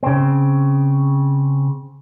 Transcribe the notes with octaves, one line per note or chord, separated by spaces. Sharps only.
C#3 C4